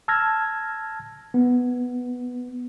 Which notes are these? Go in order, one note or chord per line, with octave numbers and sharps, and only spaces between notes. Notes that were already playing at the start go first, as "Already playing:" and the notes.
A5 E6 F6 G#6 A#6
B3